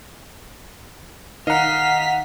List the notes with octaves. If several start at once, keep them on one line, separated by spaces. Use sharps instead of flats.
D#3 D#5 F5 F#5 A#5 F6 B6